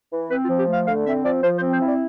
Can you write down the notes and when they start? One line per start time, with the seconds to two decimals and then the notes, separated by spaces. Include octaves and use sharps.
0.12 E3
0.30 C4 B4
0.44 F4
0.49 F3
0.58 G4
0.68 A3
0.73 F5
0.87 D3 F5
1.06 C4 E5
1.24 F3 D5
1.43 F3 C5
1.58 C5
1.62 C4
1.71 C5
1.81 E4 D5